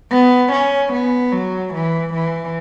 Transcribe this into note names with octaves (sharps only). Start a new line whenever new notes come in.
B3
C#4
B3
F#3
E3
E3